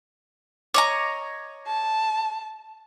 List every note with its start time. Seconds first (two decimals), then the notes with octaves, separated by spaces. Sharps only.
0.74 C#5 D#5 A#5 D6
1.67 A5